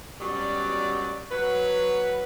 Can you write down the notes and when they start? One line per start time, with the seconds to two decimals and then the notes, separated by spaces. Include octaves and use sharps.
0.21 F#2 B2 F#3 G3 D5
1.31 F#3 B4